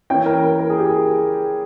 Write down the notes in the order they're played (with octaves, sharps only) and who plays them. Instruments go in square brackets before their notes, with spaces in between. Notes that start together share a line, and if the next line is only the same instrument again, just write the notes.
[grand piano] E3 A#3 C#4 E4 G5
A#4
A#4
A#4
G#4
G4
G#4